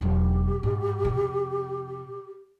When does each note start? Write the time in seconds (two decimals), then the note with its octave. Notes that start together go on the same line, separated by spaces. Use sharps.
0.01 E1 F#3 G4
0.63 G#2
1.05 F2 C3